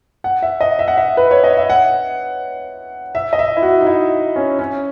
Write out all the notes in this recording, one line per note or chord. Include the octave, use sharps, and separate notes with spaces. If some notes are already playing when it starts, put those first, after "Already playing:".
F#5
E5
D#5
E5
F#5
E5
B4
C#5
D#5
E5
F#5
E5
D#5
E5
E4
F#4
D#4
E4
C#4
C#4